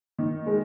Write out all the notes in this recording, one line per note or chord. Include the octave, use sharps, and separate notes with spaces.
D#3
G#3